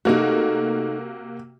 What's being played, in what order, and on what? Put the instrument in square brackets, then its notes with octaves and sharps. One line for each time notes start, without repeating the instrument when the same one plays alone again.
[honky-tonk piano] C3 A#3 F#4 [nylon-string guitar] A3 D#4